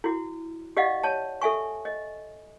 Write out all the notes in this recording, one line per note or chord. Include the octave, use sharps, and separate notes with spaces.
E4 F#4
G4 D5 D#5 F5 F#5
C#5 A5
A4 E5 G#5 C#6
D#5